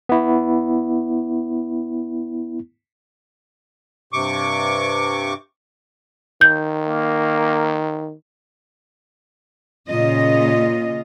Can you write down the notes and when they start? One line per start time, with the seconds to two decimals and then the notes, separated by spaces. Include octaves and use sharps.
0.09 B3 E4
4.13 G2 C3 C#6 D6
6.41 D#3 G6
6.87 A#3
9.88 A#2 C#3 F4 D#5